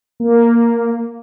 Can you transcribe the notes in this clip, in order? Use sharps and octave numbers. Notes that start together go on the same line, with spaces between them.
A#3